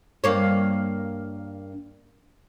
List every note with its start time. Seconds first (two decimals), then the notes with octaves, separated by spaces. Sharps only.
0.24 G2 A#3 C#5